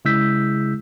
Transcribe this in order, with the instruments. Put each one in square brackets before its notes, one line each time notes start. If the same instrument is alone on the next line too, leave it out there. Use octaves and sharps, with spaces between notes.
[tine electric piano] C#3 G#3 E4 E6 G6 B6